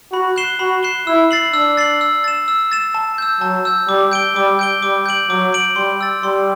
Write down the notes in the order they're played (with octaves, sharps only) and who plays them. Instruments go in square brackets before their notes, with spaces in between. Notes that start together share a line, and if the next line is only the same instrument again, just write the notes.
[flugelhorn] F#4 [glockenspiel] B5
[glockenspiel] F#6 C7 E7 G7
[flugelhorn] F#4 [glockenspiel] B5
[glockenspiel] F#6 C7 E7 G7
[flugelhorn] E4 [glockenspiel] E6
[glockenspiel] A6 C7 F#7
[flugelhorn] D4 [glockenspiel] E6
[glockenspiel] A6 C7 F#7
E6
A6 E7
E6
A6 E7
A5
E6 G6
[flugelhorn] F#3 [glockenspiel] A5
[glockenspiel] E6 G6
[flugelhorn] G3 [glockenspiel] D6
[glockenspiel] G6 D7 G7
[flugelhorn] G3 [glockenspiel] D6
[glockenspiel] G6 D7 G7
[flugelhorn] G3 [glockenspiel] D6
[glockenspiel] G6 D7 F#7
[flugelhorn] F#3 [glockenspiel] D6
[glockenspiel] G6 D7 F#7
[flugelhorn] G3 [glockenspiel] C6
[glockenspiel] E6 A6
[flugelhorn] G3 [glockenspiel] C6